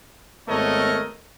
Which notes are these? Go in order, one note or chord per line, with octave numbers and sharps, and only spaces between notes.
G#1 A3 B3 A#4 C#5 D#5